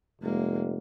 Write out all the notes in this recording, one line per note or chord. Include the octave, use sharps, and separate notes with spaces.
F1 G#3 A#3